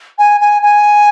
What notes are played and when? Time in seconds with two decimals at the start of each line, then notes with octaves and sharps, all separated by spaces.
0.18 G#5
0.41 G#5
0.62 G#5